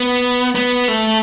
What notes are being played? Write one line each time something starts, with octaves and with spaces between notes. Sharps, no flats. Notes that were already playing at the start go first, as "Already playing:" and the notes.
Already playing: B3
B3
A3